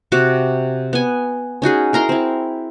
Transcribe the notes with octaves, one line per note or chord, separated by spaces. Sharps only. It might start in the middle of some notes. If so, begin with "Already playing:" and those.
C3 F#4 D6
B3 G#5
C#4 D#4 F#4 G#4
E4 A#4 A#5 C6
C4 E4